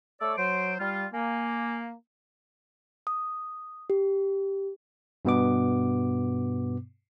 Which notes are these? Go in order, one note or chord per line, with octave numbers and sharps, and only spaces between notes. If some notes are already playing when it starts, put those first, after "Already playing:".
A3 C#5 D5 E6
F#3 C5 D7
G3 F4 F6
A#3 G#5
D#6
G4
G2 B2 B3 D6